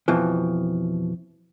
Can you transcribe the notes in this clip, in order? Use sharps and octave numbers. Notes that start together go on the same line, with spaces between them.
F2 B2 E3 F3